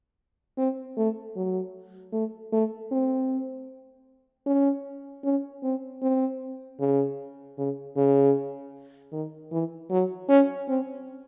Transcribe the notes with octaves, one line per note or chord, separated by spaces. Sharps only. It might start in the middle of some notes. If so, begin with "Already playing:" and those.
C4
A3
F#3
A3
A3
C4
C#4
C#4
C4
C4
C#3
C#3
C#3
D#3
E3
F#3
C#4
C4